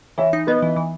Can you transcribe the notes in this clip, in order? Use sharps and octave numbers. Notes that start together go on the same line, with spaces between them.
E3 C#5 E5
D#4
B3 B4 D#5
E3
E3